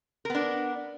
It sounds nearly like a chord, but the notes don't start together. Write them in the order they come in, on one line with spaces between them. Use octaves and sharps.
A#4 B3 D4